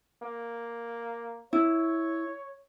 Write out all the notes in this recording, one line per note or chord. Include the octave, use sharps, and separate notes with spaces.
A#3
E4 C#5